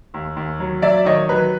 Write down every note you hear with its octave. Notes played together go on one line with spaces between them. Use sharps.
D#2
D#2
F#3
F#3 D5 E5
D#3 C#5 D#5
F#3 B4